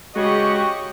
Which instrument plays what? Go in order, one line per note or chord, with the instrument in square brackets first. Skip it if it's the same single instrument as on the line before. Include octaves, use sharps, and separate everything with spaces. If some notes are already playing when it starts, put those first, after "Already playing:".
[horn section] C#3 F#4 G4 [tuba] G#3 [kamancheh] D#5 C#6